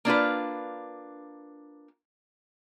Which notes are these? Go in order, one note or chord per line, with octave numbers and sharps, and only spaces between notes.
A#3 D4 F4 B4